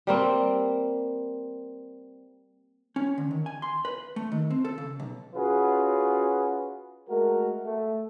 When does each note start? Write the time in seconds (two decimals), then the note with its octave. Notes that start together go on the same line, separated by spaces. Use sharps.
0.07 G3 A#3 C4
2.96 C#4
3.18 D3
3.31 D#3
3.46 G#5
3.62 C6
3.85 B4
4.16 A3
4.32 D#3
4.50 C4
4.65 A4
4.78 C#3
5.00 B1
5.34 C#4 F4 F#4 G#4 B4
7.09 G#3 A3 F#4 A#4
7.64 A3